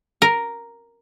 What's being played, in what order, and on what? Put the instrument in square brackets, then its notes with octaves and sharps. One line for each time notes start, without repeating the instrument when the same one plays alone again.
[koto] A#4